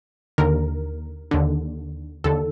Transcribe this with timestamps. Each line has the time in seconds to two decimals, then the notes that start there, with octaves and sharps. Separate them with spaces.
0.38 D#2 D3 A#4
1.31 D#2 D3
2.24 D#2 D3 A4